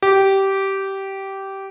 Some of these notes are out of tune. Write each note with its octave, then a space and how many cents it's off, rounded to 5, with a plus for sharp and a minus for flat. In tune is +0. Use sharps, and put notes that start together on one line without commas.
G4 -15